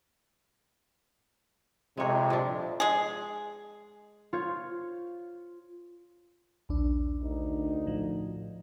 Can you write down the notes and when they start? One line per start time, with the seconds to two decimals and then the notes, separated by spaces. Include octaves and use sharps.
1.97 F2 C3 G#3 C#5
2.30 F3 D4
2.80 G#3 G#4
4.33 F4 C5 C#5
6.69 A#1 D#2 D4
7.22 D2 D#3 D#4
7.87 A2 F3